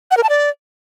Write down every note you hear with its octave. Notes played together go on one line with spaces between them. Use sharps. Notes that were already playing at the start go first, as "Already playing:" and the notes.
F#5
A#4
A5
D5